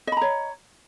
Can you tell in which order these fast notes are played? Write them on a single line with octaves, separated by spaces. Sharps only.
D#5 B5 A#5 C#5